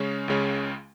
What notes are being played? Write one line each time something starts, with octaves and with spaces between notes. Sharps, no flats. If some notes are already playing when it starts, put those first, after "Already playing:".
Already playing: C#3 G#3 C#4
C#2 C#3 G#3 C#4